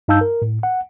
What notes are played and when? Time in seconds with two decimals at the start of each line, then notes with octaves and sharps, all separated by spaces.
0.08 G2 D#4 F5 A5 E6 G6
0.21 A#4
0.42 A2
0.63 F#5